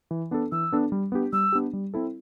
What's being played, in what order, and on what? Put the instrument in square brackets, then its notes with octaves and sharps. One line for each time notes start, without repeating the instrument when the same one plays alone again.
[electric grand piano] E3
B3 D4 A4
[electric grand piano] E3 [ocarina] E6
[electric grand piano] B3 D4 A4
G3
B3 D4 G4
[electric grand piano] G3 [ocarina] E6
[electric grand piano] B3 D4 G4
G3
C4 E4 A4